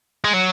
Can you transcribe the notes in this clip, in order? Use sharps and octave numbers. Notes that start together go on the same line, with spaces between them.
G#3
F#3